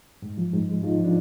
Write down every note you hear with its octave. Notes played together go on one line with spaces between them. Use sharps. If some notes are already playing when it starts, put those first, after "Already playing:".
G#2
F3
G#2
G#3
G#2 D#4 F4
F3
D4